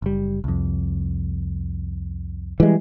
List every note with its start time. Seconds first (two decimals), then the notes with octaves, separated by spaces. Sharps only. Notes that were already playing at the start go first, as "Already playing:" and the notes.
0.02 F#1 G3
0.44 C2 F2
2.60 E3 G3 G#3